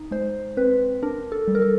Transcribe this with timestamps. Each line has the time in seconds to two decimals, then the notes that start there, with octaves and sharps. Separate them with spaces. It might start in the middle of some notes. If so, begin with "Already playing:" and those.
Already playing: D#4
0.11 G#3 C5
0.57 C4 B4
1.03 D4 A#4
1.32 A4
1.48 G3
1.55 A#4
1.62 A4